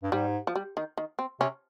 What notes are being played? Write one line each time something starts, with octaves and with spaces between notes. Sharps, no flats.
G2
G#2 G3
F3
G3
D#3
D#3
C4
C3 C#4